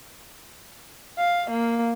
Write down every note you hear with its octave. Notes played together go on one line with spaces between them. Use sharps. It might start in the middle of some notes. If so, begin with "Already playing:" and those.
F5
A#3